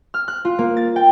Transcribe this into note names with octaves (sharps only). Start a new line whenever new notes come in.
F6
F#6
F4
A#3
A6
G5